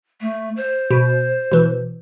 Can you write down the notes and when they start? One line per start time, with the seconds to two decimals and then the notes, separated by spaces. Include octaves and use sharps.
0.21 A3
0.57 C5
0.91 B2
1.52 B2 E3